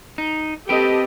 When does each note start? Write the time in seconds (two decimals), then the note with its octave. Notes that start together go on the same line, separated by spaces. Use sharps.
0.18 D#4
0.69 C4 G4 A4 B4 D#5 G5